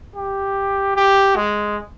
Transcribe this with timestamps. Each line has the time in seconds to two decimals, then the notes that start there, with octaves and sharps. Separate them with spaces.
0.15 G4
0.96 G4
1.36 G#3